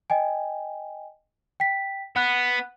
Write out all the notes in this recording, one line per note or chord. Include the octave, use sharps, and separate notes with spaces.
D#5 G5 G#5
G5 B6
B3 F#5 F#6